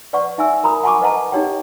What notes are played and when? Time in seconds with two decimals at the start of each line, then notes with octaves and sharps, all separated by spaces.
0.13 B4 D5 F#5 C#6
0.38 D#4 E5 G#5 E6
0.64 A#4 A#5 B5 D#6
0.83 F#5 G#5 A5 B5 C#6 D6
1.02 B4 D#5 F#5 A5 A#5
1.32 D#4 G4 C#5 F#5 G5